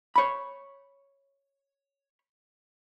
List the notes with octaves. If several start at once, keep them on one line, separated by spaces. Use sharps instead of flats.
C#5 B5